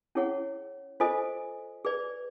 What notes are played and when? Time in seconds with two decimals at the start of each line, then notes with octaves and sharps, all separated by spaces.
0.15 C#4 E4 G#4 C#5 F#5
1.00 F4 A4 C5 D#5 G#5
1.85 G#4 B4 D5